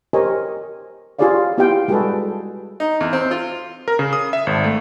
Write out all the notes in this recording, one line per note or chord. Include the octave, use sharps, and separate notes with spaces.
G4 A#4 C5 C#5 D#5 G#5
F4 G4 G#4 C#5 D5 F5
B3 E4 F4 G4 F5 G5
G3 G#3 F#4 G#4 A4 B4
D#4
E2
C4
F4
A#4
C#3
D#6
E5
G#1
A3